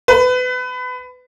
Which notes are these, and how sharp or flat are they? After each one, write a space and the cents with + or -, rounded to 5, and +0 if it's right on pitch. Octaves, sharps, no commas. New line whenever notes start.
B4 +25